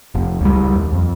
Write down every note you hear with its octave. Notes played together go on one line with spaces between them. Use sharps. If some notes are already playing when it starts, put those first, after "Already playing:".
F1
C#2 G3
D#2
F2